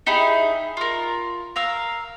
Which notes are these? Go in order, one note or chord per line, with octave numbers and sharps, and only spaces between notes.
D#4 E4 G4 G#4
F4 A#4
A#4 F5 E6